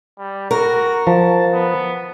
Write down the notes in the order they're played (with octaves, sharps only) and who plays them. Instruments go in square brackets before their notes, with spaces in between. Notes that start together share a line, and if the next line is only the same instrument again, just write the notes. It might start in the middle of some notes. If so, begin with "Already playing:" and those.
[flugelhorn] G3
[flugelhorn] F#4 [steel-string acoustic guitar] A#4
[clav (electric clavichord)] F3 [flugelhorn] A5
[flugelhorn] B3